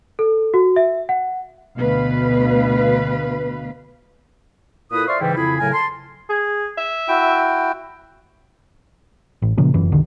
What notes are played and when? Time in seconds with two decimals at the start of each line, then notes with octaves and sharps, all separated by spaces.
0.19 A4
0.54 F#4
0.76 E5
1.09 F#5
1.79 D2 B2 B4 F5
4.91 A#2 E4 A4 B4 D#6
5.07 C5 D5 E5 F5 C6 C#6
5.20 G#2 C#3 E3 G3 E4 G5
5.36 F2 C#3 E4 G#4 B5
5.59 A2 C#3 F#3 A#4 G#5
5.73 A5 C6
6.30 G#4
6.78 E5
7.08 E4 F#4 G5
9.42 A1
9.58 A#2 C#3 F3 A#3
9.74 F1 F#2 E3
9.92 C2 D3 D#3